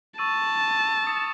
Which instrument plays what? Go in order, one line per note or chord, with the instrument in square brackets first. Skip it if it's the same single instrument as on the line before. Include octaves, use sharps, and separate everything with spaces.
[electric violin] A5 [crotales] C#6 E6 A6 D#7
[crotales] D#6 A6 C#7 E7